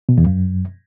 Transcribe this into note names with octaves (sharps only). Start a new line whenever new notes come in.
B2
E2
F#2